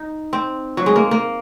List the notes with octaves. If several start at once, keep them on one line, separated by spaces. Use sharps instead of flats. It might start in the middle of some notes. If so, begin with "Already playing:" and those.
Already playing: D#4
C4
F#3
G#3
A#3
A#3